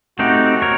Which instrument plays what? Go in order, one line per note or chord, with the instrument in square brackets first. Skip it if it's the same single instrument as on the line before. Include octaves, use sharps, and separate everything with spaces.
[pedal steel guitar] A3 C4 D#4 G4 [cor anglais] F#4
[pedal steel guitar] A#4 C#5